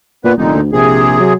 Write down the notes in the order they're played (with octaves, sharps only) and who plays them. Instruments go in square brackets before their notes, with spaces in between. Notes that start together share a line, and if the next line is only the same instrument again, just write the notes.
[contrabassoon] A#2 [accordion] B3 B4
[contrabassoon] F1 [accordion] A#2 D3 D#4
[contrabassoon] D2
[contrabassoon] A#1 [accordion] C3 G#4
[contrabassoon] F#3